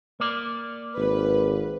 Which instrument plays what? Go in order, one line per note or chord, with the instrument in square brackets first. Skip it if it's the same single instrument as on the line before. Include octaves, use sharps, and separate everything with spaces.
[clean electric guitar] A#3 D5
[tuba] G#1 [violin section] B4